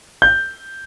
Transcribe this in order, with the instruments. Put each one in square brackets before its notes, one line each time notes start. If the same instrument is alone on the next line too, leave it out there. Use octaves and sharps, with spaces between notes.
[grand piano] G6